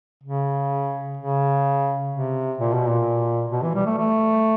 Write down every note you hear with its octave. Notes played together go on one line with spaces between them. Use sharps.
C#3
C#3
C3
A#2
B2
A#2
B2
E3
G3
A3
A3